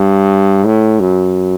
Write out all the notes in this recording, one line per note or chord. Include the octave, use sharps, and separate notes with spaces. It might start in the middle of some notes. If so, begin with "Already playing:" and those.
Already playing: G2
A2
F#2